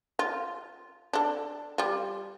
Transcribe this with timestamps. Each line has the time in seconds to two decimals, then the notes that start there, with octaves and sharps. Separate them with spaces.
0.19 F4
1.13 D4 A4
1.78 G3 F4